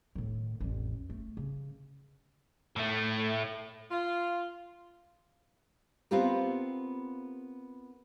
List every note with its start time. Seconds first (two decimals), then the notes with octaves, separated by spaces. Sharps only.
0.15 A2 D#3
0.60 A1 F2
1.10 A3
1.37 C#3
2.76 A2 A3
3.91 F4
6.11 B3 C4 F4 G4 A#4